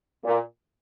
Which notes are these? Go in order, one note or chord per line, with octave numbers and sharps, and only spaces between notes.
A#2